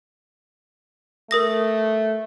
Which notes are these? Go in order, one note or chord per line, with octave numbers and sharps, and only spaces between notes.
A3 A#4 D#6 A#6